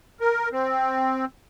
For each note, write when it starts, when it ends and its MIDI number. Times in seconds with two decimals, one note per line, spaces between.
0.20 0.49 70
0.52 1.25 60